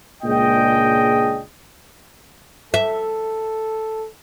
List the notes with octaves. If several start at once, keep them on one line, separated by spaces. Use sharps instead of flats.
C#2 A#2 G#3 D4 D#5 G5
A4 E5